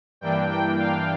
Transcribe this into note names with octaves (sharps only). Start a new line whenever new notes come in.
G2 E3 A#3 D4 G5
G5
F5